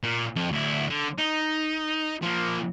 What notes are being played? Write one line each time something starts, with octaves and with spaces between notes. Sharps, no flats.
A#2
F2
D2 E4
D3
D#4
F3 A#3